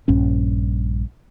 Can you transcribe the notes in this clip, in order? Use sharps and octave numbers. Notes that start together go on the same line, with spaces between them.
A#1 G2 C#4